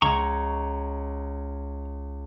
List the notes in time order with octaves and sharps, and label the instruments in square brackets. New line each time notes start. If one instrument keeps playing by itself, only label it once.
[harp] C#2 G#6 [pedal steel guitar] A#5 C#6